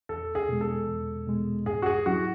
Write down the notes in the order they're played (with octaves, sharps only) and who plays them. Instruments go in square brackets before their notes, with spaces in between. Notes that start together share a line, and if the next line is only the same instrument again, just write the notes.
[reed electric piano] E2 [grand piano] A4
[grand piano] G#4
[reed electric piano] B2 G#3
[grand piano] A4
[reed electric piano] E2
B2 G#3
[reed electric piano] G#2 [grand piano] G#4
[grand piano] F#4
G#4
[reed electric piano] F#3 C#4 E4 [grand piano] F#4